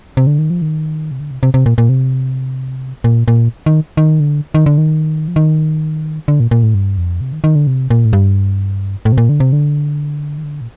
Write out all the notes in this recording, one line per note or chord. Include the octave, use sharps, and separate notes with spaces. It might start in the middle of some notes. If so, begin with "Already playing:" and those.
C3
D3
D#3
F3
D#3
C3
D3
C3
C3
C3
A#2
A#2
C3
A#2
A#2
D#3
D#3
D3
D#3
D3
D#3
F3
D#3
D3
A#2
A#2
A2
G2
F2
C3
D#3
D#3
D3
C3
A#2
A2
G2
A2
C3
A#2
D3
C3
D3
D#3
D3
A#2